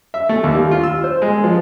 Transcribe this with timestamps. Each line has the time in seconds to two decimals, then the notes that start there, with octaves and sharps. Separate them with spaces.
0.14 E5
0.29 A3
0.43 D#2
0.55 G3
0.71 F4
0.84 E6
1.04 C5
1.22 G#3
1.44 F3